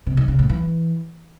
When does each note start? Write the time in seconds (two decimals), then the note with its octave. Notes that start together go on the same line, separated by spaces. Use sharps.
0.06 C3
0.17 D#3
0.28 C#3
0.39 A2
0.49 E3